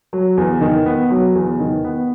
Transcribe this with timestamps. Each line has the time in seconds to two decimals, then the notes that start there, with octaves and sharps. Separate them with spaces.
0.13 F#3
0.37 E2
0.61 D#3
0.86 B3
1.10 F#3
1.35 E2
1.60 D#3
1.84 B3